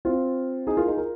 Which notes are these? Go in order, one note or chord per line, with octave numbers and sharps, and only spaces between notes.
C4 F4
D#4 G#4
F4 A#4
D#4 G#4
F4 A#4